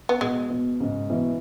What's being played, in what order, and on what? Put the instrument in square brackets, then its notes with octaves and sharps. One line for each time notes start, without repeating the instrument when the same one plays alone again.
[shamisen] B3
[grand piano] B2 [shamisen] G#3
[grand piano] B2
G#2 C#3
B2 E3